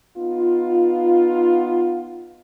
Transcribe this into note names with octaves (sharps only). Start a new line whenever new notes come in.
B3 D#4 F4